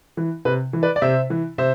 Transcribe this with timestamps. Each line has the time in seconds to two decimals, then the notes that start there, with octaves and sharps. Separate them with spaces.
0.17 E3
0.45 C3 B4
0.73 E3
0.83 B4 D5
0.96 D5
1.02 C3 C5 E5
1.30 E3
1.58 C3 C5 E5